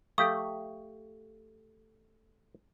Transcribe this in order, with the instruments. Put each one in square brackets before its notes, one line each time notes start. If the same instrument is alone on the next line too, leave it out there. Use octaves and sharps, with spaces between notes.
[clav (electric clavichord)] A3 G4 [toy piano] A4 F5 C#6 [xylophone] D#6